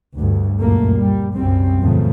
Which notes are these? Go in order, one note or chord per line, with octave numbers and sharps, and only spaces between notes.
D2 G2
C#2 F#2 A#2 A3 A#3
G3
C2 F#2 G3 C4
E2 A#2 C#3 F3 A3